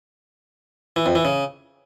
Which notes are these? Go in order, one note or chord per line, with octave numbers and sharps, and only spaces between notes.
E3
F2
E3
C#3